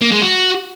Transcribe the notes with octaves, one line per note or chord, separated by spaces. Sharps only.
A#3
G#3
F#4